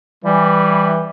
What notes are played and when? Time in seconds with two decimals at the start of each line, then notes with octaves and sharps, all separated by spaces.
0.24 E3 G3